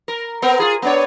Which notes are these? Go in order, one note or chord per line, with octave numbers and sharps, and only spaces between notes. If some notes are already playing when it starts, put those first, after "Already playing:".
A#4
B3 C4 A#4
F4 G#4
B3 D4 C#5